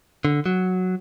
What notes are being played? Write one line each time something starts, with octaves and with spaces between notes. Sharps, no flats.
D3
F#3